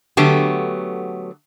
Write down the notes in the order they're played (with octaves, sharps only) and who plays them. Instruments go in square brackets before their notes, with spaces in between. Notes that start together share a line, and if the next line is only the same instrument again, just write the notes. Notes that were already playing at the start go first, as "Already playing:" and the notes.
[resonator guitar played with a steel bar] D3 F#3 A3 B3 G4